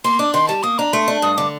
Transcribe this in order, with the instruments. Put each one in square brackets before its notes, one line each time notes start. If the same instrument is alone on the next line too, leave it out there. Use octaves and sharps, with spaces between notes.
[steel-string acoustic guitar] A#3 [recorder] C6
[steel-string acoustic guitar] D4 [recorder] D6
[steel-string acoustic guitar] D#3 [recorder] C6
[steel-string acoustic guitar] G3 [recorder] A5
[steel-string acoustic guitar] A#3 [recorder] D#6
[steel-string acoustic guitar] D4 [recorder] A#5
[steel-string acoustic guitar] A3 [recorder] C6
[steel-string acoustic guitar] D4
[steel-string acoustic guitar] G2 [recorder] D#6
[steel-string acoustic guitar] D3 [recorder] D6